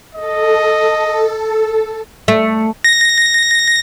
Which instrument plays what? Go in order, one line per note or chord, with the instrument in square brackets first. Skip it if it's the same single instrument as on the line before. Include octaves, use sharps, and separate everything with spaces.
[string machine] A4 [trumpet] D#5
[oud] A3
[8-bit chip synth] A#6